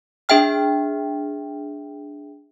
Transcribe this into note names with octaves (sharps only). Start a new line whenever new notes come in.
D4 G#4 E5 G5 F6